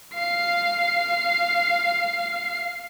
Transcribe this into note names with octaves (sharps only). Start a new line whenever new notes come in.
F5 C7